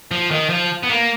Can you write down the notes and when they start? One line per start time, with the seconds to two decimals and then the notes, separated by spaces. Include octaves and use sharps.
0.11 F3
0.31 D#3
0.50 F3
0.83 B3
0.90 A#3